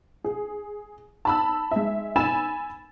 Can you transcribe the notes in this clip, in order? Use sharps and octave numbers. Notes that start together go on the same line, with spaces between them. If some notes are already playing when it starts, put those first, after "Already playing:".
G#4
A5 B5 E6
G#3 E5
G#5 B5 E6 A6 E7